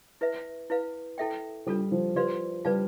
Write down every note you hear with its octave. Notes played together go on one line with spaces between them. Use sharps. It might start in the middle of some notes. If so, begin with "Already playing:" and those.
E4 B4 E5
E4 B4 F5
E4 A4 E5 G5
G3 D4 F4 A4
F3
F3 G4 B4 D5 F5 C6
G3 B4 D5 F5 A5